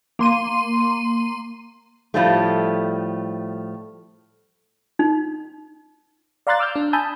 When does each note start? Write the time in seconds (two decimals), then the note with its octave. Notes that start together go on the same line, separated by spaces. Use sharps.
0.19 A#3 C6 D#7
2.14 A2 F3 G3 A3
4.99 D#4
6.47 D5 F5 A#5 C6 F#6 A6
6.59 D6 E6 F6 G6
6.76 D4
6.93 G#5 A5 B5 D#6 E6 G6